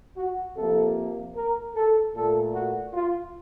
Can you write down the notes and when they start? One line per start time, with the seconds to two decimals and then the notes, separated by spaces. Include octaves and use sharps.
0.17 F#4
0.57 C3 F3 A#3 A4
1.35 A#4
1.75 A4
2.15 A#2 A3 A4
2.54 F#4
2.94 F4